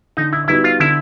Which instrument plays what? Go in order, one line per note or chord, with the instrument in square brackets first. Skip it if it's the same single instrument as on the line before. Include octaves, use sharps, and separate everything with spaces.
[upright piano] D3 [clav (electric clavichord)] D#4
[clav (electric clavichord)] E4
[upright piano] G3 B3 D#4 F#4 [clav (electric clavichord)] E4
[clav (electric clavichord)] F4
[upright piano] D3 [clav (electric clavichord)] E4